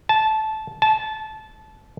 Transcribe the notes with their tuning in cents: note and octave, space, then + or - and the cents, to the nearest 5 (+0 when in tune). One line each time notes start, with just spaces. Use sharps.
A5 -15
A5 -20